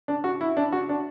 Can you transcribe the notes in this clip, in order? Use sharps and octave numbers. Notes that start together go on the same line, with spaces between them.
D4
F#4
E4
D4
F#4
D4